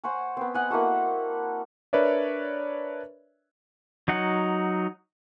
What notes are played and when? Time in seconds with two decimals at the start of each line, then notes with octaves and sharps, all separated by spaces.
0.04 C5 C#5 F#5 G#5
0.37 B3 C4
0.54 D#5 F#5 G#5
0.71 A#3 E4 F#4 A4
1.93 D4 A#4 B4 C#5 D5 E5
4.08 F#3 D#4 F#5